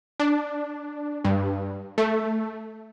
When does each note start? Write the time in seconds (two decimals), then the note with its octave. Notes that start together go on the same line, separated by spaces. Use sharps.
0.20 D4
1.24 G2
1.98 A3